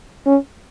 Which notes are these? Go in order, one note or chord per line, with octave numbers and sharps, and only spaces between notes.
C#4